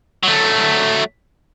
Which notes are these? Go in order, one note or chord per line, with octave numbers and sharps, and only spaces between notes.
F#3 A3